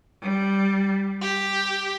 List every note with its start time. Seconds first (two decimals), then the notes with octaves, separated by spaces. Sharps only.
0.21 G3
1.21 G4